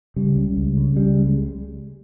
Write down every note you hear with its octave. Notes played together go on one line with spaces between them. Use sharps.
C#3 G3
C#2
C#2
C#3
C#3 G3
C#2
G#3